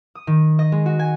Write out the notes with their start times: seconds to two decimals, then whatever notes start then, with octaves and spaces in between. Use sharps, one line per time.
0.15 D#6
0.27 D#3
0.59 D#5
0.72 G#3
0.86 F#4
0.99 G#5